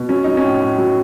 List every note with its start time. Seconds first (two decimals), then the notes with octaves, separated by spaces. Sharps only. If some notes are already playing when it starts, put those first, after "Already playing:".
Already playing: B2
0.09 F#3 C#4
0.24 F#3 D#4
0.37 C#4
0.44 A2
0.61 A2
0.78 F#3